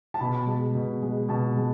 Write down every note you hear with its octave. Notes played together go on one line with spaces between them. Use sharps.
A5
B2 B5
G#3
B2
G#3
B2 A5
G#3